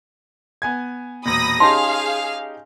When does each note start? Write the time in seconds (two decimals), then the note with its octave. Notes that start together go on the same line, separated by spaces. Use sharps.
0.62 B3 G#5 G#6
1.25 E1 A#2 B5 D#6 A#6
1.60 C#4 D#4 G4 G#4 F5 A5 C6